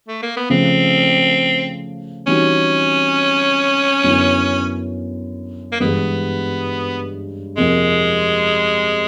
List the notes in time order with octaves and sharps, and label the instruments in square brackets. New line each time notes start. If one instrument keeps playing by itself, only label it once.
[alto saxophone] A3
A#3
B3
[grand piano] C#3 F3 A3 [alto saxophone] C4
[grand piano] E3 G3 C4 D#4 F#4 [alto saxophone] C#4
[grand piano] F#2 D3 F#3 B3 E4
[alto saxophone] A#3
[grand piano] G2 E3 G#3 [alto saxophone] B3
[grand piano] F2 C3 F3 A#3 [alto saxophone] G#3